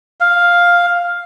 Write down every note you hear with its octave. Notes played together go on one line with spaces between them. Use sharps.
F5